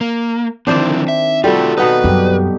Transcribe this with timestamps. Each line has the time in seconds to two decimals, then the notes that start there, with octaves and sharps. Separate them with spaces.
0.01 A#3
0.67 D3 D#3 F3 C4 D4 E4 C5 D5
1.08 E5
1.44 G3 A3 F4 F#4 A4
1.77 B2 B3 D#4 B4
2.04 F#2 G3 G4